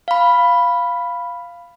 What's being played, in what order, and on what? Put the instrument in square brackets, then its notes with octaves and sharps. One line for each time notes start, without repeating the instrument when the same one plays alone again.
[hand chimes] F5 B5